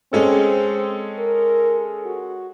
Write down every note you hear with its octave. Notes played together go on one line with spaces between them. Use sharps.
G#3 C4 C#4 A4
A#4
F#4